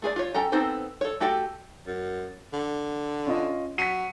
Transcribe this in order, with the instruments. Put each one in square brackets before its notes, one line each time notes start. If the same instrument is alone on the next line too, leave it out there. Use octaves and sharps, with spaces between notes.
[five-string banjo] A3 G#4 B4 D5
F4 C#5
C#4 A4 G5 A#5
B3 C4 D#4 A4 C5
A4 C#5
A3 F#4 G4 A4 G5
[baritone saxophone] F#2
D3
[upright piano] C#4 F4 D#5
[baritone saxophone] F#3 [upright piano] B6 C#7 D#7